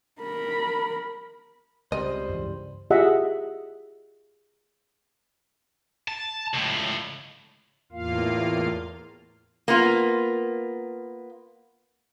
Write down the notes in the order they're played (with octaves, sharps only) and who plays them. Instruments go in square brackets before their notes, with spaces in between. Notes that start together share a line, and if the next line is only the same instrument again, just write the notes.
[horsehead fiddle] A#4 B5
[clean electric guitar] C#2 G3 [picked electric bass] C4 [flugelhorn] C5 [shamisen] D#5
[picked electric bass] G2 E3 F3
[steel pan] F4 G4 G#4 D#5 E5 F#5
[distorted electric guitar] A5
C#2 A2
[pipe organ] E2 A2 A#3 F4 F5
[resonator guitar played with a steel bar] A#3 B3 F4